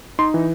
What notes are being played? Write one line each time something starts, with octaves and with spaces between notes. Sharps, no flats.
D#4 C6
E3